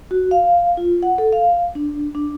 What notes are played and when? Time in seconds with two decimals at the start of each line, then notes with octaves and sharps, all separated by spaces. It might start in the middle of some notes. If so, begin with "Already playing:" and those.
0.11 F#4
0.31 F5
0.77 F4
1.03 F#5
1.18 A4
1.33 F5
1.75 D4
2.15 D4